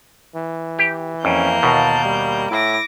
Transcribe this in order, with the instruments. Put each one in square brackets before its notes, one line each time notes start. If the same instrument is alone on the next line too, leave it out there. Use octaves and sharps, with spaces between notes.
[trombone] E3
[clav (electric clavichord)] G4
[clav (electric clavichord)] F2 [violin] A#3 G6 [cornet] C#4
[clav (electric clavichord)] D#2 B2 [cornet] A5
[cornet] G3
[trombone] A2 [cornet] E4 [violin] D6 A#6